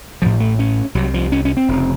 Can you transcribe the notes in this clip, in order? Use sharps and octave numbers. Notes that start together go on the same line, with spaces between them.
A1 A2 F3
A3
C#4
C2 C3 F#3
F3
C#4
C#4
C4
F1 F2 C#3